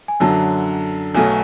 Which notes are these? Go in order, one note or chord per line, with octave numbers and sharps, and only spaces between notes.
G#5
F#2 D3 F#3 A5
B1 B2 F#3 A3 G#5